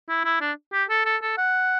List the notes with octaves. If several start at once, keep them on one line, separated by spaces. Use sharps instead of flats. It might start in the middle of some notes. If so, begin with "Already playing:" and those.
E4
E4
D4
G4
A4
A4
A4
F#5